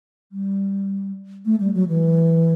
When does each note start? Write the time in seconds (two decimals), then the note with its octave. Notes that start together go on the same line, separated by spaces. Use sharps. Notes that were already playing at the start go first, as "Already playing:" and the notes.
0.32 G3
1.46 A3
1.60 G3
1.74 F#3
1.88 E3